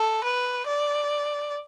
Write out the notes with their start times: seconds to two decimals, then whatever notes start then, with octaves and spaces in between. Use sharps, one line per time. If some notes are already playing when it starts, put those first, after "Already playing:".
Already playing: A4
0.24 B4
0.67 D5